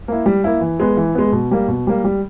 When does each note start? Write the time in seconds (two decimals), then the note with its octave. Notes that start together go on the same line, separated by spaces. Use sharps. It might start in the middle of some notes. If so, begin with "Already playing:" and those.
0.08 A#3 E4
0.26 G3
0.44 A#3 E4
0.61 E3
0.80 G#3 B3
0.97 E3
1.15 G#3 B3
1.32 B2
1.51 G3 A#3
1.68 B2
1.87 G3 A#3
2.04 G3